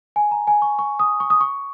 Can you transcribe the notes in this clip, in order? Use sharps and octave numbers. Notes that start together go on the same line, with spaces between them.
G#5
A#5
G#5
C#6
C#6
D#6
C#6
D#6
C#6